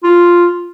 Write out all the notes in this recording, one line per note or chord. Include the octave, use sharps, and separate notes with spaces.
F4